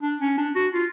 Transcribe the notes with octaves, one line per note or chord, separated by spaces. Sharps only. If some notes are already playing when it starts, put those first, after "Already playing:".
D4
C#4
D4
F#4
F4